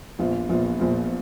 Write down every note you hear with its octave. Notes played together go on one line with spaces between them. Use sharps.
A#1 A#2 F3 B3 F4
A#1 A#2 F3 B3 F4
A#1 A#2 F3 B3 F4